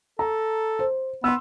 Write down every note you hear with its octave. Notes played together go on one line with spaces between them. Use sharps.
A4 A#5
C5
B3 C6 E6